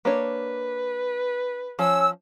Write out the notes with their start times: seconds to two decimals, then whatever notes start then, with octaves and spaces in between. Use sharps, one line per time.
0.05 A#3 D4 B4 C#5
1.79 F3 C#4 E6